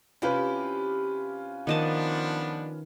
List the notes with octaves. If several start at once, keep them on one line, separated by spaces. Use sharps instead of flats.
C3 C#4 E4 F4 G4 B4
D#3 F3 B3 D4 D#5 A5